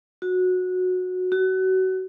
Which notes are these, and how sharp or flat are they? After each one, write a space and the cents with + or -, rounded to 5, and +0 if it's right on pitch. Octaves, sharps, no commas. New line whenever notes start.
F#4 -15
F#4 +25